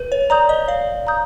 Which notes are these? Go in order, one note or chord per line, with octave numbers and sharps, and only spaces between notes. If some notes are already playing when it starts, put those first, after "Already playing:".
Already playing: B4
C#5
D5 A#5 D#6 G6
D#5
D5 F5
A#5 D#6 G6